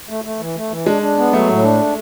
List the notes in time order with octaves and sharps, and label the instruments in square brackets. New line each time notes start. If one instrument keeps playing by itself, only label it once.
[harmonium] A3
A3
E3
A3
E3
[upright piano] G#3 [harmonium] D4
[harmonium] D4
B3
[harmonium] F#3 [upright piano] A3
[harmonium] A2
D4